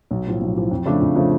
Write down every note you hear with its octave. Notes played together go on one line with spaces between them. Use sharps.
B1
A2 F3
B1
A2 F3
F2
C#3 F3 A3 D4
F2
C#3 F3 A3 D4